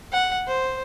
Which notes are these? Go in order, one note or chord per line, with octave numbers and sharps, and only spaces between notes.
F#5
C5